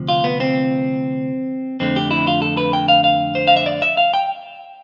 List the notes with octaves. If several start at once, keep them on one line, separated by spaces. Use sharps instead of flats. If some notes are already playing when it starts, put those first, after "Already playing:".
Already playing: D2 C3 F3
F4
B3
C4
F2 D3 A3 C4
G4
E4
F4
A4
B4
G5
F5
F5
C5
F5
E5
D5
E5
F5
G5